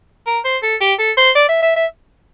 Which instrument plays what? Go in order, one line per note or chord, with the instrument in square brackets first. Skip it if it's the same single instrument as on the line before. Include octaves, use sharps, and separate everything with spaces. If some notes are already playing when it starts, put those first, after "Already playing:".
[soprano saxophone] A#4
C5
A4
G4
A4
C5
D5
E5
E5
E5